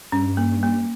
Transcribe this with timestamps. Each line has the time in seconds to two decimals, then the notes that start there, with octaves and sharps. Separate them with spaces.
0.12 G2 C#4
0.37 A#3
0.63 A#3